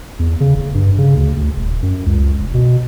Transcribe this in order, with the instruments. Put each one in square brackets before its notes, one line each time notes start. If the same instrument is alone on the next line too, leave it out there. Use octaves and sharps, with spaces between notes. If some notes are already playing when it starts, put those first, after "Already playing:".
[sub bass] E2
C#3
F#1
G2
C#3
D2
D2
D#1
F#2
C#2
F1
B2